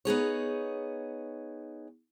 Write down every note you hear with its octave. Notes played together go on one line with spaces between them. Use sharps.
B3 D#4 G#4 C#5